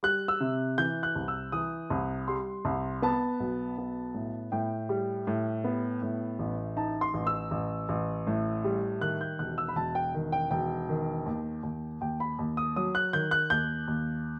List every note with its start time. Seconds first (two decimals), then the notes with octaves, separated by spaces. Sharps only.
0.03 G3 F#6
0.28 E6
0.41 C3
0.78 E3 G6
1.03 F#6
1.15 C2
1.28 E6
1.52 E3 D#6
1.90 C2
2.28 G3 C6
2.65 C2
3.02 B3 A5
3.40 B1
3.78 B3
4.14 A2
4.52 A2 G5
4.89 G3
5.27 A2
5.64 B3
6.02 A2
6.39 A1
6.76 D#4 A5
7.01 C6
7.14 A1
7.27 E6
7.51 A1
7.89 A1
8.27 A2
8.64 G3
9.01 D#3 F#6
9.21 G6
9.39 E1 F#6
9.58 E6
9.68 B5
9.76 E1 A5
9.95 G5
10.14 D#3
10.32 G5
10.51 E1 G5
10.89 D#3
11.26 D#2
11.63 D#2
12.01 D#2 G5
12.20 B5
12.39 D#2
12.57 D#6
12.76 F#3 D#6
12.95 F#6
13.13 D#3 G6
13.31 F#6
13.50 D#2 G6
13.88 D#2